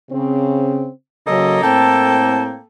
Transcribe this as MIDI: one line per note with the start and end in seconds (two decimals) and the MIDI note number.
0.11 0.88 49
0.11 0.88 60
1.27 1.61 49
1.27 1.61 54
1.27 2.64 58
1.27 2.64 69
1.27 1.61 75
1.63 2.54 45
1.63 2.54 60
1.63 2.62 79
1.63 2.43 81